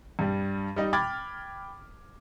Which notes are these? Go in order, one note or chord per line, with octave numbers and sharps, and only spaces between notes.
G2 G3
G3 D#4 D#5
G5 B5 D6 F6 G#6 A6